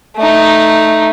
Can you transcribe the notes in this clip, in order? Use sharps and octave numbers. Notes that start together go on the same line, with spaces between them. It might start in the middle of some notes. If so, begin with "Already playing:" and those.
A3 D#4